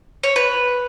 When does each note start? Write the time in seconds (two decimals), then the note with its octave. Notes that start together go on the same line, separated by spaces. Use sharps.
0.23 C#5
0.36 B4